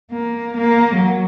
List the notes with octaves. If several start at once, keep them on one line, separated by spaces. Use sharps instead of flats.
A#3
A#3
F#3